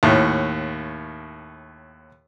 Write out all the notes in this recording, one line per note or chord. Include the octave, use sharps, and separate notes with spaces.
D#2 A2